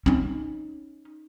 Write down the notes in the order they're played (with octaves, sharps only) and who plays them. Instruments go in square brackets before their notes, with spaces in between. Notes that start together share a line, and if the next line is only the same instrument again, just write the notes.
[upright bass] C#4 D#4